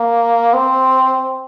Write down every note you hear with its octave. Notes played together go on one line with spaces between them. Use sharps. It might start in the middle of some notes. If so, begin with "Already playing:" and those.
Already playing: A#3
C4